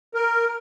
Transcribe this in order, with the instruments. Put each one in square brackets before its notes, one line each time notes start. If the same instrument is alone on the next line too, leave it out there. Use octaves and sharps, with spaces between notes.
[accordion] A#4